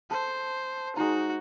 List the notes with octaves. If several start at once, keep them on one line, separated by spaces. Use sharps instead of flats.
A4 C5
G#3 D#4 F#4 C5 A#5